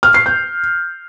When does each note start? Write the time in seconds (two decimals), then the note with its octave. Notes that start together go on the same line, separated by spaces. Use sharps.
0.03 F6
0.14 C7
0.26 G6